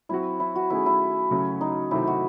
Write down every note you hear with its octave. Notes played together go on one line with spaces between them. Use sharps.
F#3 C4 E4 F#4
E4
F#4
D#3 A3 C#4 E4 G#4
E4
C#3 F#3 A3 C#4
D#4
C3 D#3 F#3 A3 C4 E4
F#4